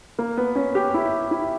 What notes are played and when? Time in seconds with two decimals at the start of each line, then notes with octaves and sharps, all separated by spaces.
0.19 A#3
0.37 B3
0.55 C#4
0.75 G4
0.94 E4
1.31 E4